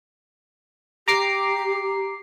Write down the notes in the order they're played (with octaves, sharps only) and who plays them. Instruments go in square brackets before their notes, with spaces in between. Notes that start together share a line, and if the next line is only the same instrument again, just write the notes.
[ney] G4 [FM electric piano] A#5 D6 C7